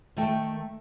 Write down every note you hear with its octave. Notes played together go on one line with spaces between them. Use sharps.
D#3 A3 G5